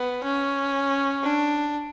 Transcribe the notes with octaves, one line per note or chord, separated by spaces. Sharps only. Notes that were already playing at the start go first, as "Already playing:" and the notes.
Already playing: B3
C#4
D4